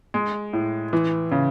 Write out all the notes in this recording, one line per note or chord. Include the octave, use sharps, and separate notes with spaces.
G#3
A2
E3
C#3